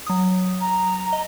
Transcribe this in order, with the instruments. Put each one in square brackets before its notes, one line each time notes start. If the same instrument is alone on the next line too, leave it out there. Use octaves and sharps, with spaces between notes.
[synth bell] F#3 D#6
[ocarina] A#5
[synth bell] D#5